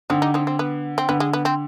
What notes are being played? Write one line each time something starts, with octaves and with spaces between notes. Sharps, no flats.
D3 C4 D#4
D#4 G4
C4 D#4
C4
B3
C4
D3 B3
G#3
B3
C4